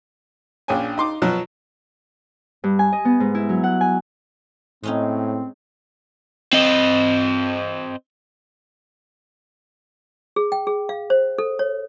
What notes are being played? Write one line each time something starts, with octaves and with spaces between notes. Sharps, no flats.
A#1 C#4 D4 G5 G#5
D#4 C6 D6
B2 F3 F#3
G2
G#5
D#5
B3
G#2
E4
F#3
F#5
G#5
A2 G#3 C4 C#4 D#4
C4 D#5
G#4
G5
G#4
F5
C5
A4
C#5